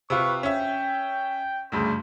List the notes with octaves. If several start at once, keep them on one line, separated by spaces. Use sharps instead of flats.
C3 F4 B4 C#6
C#4 E5 G5
D2 G2 C#3 D4 C5